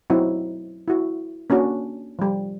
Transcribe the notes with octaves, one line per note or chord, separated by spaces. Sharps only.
F#3 C4 D#4 E4 F#4
E4 F#4
A#3 C#4 D4 F#4
F3 G3